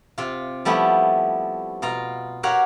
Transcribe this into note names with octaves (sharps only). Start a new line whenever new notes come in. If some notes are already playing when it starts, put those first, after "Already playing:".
C3 F4
F3 G3 A3 B3 E4
B2 F4 A#5
F#4 G4 A#4 C#5 F5 F#5